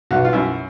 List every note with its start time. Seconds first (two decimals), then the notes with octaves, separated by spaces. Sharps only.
0.11 B1 F#4
0.25 F4
0.33 F#2 E4